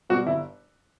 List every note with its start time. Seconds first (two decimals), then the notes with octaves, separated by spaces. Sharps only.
0.10 B2 G3 F#4
0.27 G1 E4